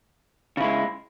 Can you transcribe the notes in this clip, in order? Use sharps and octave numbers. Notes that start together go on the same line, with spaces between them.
C#3 G#3 E4